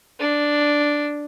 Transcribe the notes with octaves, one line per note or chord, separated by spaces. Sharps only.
D4